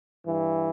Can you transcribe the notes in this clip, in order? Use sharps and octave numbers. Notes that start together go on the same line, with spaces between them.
G2 E3